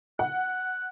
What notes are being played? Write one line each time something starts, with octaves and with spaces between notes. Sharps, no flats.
F#5 F#6